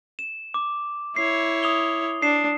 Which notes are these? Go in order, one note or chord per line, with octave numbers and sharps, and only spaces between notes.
E7
D6
E4 C#5 C7
D#6 F7 G7
D4 C7 E7